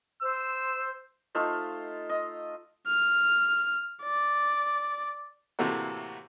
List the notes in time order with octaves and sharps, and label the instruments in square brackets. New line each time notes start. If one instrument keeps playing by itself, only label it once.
[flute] C5 [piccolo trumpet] E6
[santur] A3 D#4 F4 C5
D#5
[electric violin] F6
D5
[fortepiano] A2 C3 E3 A3 A#3 F#4